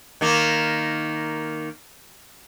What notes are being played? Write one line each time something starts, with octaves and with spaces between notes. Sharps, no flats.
D#3 A#3